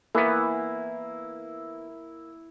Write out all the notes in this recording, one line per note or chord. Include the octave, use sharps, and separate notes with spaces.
E3 A#3 B3 E4